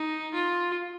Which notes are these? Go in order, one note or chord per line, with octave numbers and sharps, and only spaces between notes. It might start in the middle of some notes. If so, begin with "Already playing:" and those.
Already playing: D#4
F4